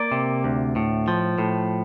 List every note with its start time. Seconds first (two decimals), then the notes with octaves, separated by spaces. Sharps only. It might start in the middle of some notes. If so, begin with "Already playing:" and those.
Already playing: A#3 D5
0.12 C3
0.44 D2
0.76 A2
1.08 F3
1.39 A2